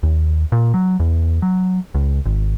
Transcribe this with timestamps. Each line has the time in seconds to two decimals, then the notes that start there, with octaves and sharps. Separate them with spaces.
0.03 D#2
0.52 A#2
0.74 F#3
1.00 E2
1.42 F#3
1.95 C#2
2.25 G#1